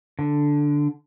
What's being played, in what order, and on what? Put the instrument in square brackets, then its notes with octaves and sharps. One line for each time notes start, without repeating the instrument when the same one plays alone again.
[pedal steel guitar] D3